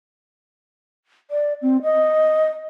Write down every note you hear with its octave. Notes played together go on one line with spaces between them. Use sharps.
D5
C4
D#5